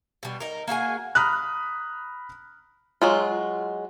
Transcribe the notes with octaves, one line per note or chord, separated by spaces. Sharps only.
B2 G3
D#4 A#4
A#3 F#4 G#4 G#5
A#5 B5 D#6 F6 F#6
F#3 G#3 F4